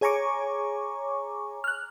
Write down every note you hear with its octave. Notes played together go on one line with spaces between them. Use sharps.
G#4 C#5 G#5 A#5 C#6 D6
F6 F#6